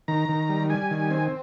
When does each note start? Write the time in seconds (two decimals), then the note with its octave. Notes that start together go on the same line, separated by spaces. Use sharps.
0.08 D#3 A#5
0.29 D#3
0.49 G3
0.70 G3 G#5
0.91 D#3
1.10 C4